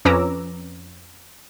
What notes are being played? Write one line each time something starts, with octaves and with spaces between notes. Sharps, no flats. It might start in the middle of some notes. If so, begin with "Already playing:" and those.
F2 C#4 B4 A#5 D6 E6